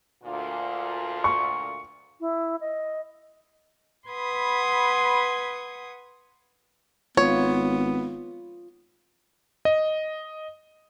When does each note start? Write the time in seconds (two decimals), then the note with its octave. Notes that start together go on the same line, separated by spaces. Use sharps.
0.24 D2 A#2 F4
1.24 C#6
2.20 E4
2.61 D#5
4.09 B4 F#5 B5 C6 D#6 G#6
7.17 G#1 B3 F4 C#5
9.65 D#5